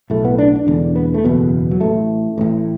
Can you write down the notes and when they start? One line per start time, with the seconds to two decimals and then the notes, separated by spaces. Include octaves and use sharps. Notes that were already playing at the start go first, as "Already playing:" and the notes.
0.10 B1 A2 A3
0.25 B3
0.39 D4
0.56 D4
0.67 E1 E2 D3
0.96 B3
1.14 A3
1.24 F#1 E2 B2 B3
1.71 F#3
1.81 A1 A2 A3
2.38 A1 A2